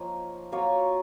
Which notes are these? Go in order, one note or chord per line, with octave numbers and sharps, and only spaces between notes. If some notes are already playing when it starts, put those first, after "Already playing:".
Already playing: F3 A#3 D#4 F4 C#5
F#3 A#3 F4 C#5 F5